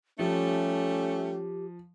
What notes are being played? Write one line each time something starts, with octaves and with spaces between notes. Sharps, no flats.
F3 G3 A3 C#4 G4